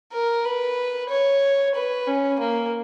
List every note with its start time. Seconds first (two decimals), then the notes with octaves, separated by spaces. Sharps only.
0.13 A#4
0.45 B4
1.10 C#5
1.75 B4
2.07 C#4
2.39 A#3